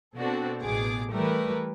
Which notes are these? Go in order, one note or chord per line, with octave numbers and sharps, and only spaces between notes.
B2 C4 D4 F#4 A4
A1 B2 G#4 D6
E3 G3 A3 A#4 B4